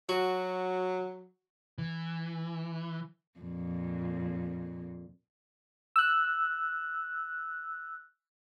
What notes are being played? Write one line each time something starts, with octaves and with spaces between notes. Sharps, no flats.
F#3 F#4
E3
F2 A#2
E6 F#6